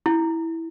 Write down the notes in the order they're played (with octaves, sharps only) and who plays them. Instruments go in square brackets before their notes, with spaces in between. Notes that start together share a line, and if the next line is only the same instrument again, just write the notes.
[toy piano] E4